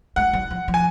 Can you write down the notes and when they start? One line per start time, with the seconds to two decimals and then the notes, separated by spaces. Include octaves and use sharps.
0.16 G#3 F#5
0.33 G3
0.50 F3
0.68 F3
0.74 G#5